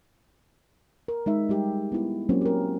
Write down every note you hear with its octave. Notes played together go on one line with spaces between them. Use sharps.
A#4
G#3 D#4 E5
G3 G#3 G4
B3 E4
F#3 A#3 C4 C#4
G4 A#4